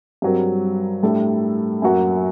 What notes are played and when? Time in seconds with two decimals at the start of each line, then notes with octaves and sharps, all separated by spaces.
0.22 G2 F#3 C4 F#4 A#4
1.03 A2 G3 D4 A4
1.82 F#2 F#3 A#3 F#4